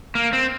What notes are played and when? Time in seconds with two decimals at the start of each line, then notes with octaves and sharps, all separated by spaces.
0.15 A#3
0.33 C4